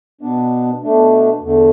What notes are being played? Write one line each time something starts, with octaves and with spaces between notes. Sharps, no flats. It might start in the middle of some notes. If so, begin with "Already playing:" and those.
B2 B3 D4
B2 A3 D4
E2 D3 A3